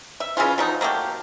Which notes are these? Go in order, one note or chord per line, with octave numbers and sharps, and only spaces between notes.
E5
C#3 E3 C#4 F4
F3 F#3 D#4
F#3 A3 A#3 G4